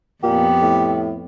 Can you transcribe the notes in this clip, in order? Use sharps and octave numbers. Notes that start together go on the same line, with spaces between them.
F2 A#2 B3 G4
A2